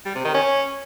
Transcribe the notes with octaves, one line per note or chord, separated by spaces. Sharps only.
G3
C3
D#3
C#4